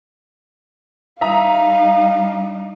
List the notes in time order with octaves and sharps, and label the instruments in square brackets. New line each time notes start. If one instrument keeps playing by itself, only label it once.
[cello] G3 D#4 [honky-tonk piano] E5 A#5 D#6 [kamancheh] F5